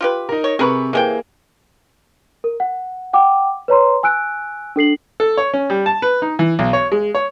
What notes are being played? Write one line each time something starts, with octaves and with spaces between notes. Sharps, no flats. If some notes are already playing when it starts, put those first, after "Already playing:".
F4 G4 B4
D#4 A#4
C#5
C3 G#4 A#4 B4 B5 C#6
C3 E3 A#3 G#4 G5
A#4
F#5
F#5 G5 D6
B4 C#5 A#5 C6
G#5 E6 F#6 D7
D4 A4 C7 F#7
A4
C#5
C#4
G3
A5
B4
D#4
E3
B1
C#5
G#3
C#5